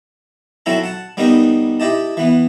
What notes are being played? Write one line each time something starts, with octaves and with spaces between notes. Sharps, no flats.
F#3 C4 E4 A4 A#5
F#5 A5
G3 B3 C4 D#4 A#4
E4 G4 D#5 A5
E3 B3